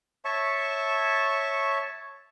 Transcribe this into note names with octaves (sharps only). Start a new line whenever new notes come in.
C#5 E5 A5 C#6